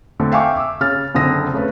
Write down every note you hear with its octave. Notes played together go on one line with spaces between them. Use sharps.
D3 A3 C4
E5 F5 G5 G#5 C#6 D6
D6 E6
C#3 F6 A6
F#1 D3 C4 D#6 A#6
C#3 A3 B4